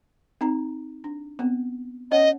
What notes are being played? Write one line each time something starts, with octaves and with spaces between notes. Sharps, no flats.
C4 D#4 A#5
D4
B3 C4
C#4 C#5 D#5 F#5